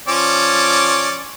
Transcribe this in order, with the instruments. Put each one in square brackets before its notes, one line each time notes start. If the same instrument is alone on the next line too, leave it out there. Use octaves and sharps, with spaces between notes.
[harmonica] F3 C#4 D5